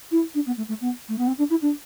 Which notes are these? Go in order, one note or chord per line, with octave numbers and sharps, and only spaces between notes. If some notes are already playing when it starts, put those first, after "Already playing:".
E4
D4
B3
A3
A3
B3
A3
B3
C4
D4
E4
D4